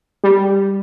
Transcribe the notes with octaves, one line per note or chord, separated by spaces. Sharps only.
G3